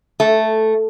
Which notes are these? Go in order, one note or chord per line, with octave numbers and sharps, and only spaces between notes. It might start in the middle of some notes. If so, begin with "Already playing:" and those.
A3